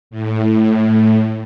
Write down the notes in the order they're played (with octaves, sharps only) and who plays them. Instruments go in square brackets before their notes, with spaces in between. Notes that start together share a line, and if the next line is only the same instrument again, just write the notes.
[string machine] A2